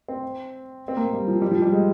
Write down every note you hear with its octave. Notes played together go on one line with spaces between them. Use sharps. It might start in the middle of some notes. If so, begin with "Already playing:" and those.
C4
C4
A#3
G3
F3
G3
F3
G3
G#3